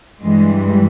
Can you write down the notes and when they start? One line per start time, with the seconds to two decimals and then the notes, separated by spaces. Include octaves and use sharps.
0.22 G2 E3 G3 G#3